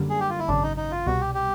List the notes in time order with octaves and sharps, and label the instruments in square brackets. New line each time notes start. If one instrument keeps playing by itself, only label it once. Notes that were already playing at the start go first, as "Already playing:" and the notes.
Already playing: [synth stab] F#2 D3 G3 A#3
[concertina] G#4
G4
F4
E4
[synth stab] G#1 F#2 C#3 [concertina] D4
[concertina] D#4
D#4
F4
[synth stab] C2 B2 G3 [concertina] F#4
[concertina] G4
G4